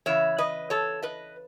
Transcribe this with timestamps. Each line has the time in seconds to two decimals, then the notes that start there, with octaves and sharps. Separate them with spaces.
0.06 C#3 E3 C#5 E5
0.38 B4 D#5
0.70 A4 C#5
1.02 B4 D#5